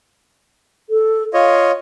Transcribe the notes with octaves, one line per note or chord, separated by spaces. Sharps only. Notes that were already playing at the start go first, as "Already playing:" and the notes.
A4
F4 C#5 D#5 F5